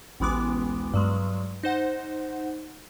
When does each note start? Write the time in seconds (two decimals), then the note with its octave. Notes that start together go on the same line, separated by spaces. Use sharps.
0.20 A1 D2 E3 G#3 B3 D6
0.94 G2 F#3 G#3
1.63 D#4 C5 F#5